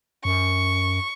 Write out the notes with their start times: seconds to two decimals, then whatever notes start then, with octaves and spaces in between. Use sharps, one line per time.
0.25 F#2 C#6